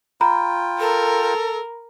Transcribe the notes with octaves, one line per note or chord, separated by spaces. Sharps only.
F4 G5 A#5 B5
A4 A#4